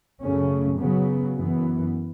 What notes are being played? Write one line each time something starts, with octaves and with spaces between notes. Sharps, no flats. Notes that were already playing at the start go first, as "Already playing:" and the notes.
F#2 C#3 A3 C#4
C#3 F#3 B3
F#2 E3 B3